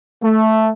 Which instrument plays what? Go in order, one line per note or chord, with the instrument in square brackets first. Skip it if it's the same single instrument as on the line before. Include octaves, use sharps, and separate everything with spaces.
[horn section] A3